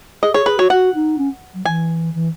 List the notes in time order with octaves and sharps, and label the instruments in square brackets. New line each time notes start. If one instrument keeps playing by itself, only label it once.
[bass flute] G#4 [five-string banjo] D#5
[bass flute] G#4 [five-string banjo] C#5
[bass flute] G#4 [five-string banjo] B4
[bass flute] F#4 [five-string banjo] C#5
[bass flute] F#4 [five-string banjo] F#5
[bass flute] D#4
C#4
F#3
[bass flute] E3 [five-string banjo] G#5
[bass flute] E3